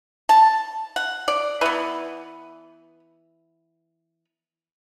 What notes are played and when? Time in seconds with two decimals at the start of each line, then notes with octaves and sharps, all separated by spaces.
0.29 A5
0.96 F#5
1.28 D5
1.61 E3 B3 B4